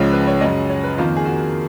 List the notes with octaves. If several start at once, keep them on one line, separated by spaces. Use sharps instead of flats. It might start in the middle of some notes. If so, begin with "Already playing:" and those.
Already playing: C#2 C#3 F3 G#3 C#5
B4
C#5
F#2 C#3 G#3 C#4 D#5
C#5
B4
F2 D#3 A#3 F4
G#4
F#4